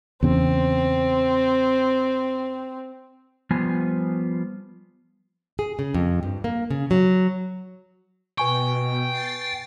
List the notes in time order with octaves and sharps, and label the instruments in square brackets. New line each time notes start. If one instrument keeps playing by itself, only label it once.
[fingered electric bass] E2 C#3 [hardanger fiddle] C4
[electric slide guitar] F3 G3 B3 F4 G#5
[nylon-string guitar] G#4
C#3
F2
G2
A#3
C#3
F#3
[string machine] B2 [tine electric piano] B4 G#5 C#6 [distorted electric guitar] G5
[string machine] A6 C7